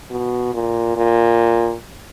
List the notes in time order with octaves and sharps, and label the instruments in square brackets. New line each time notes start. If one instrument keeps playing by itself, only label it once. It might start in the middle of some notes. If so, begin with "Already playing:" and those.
[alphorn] B2
A#2
A#2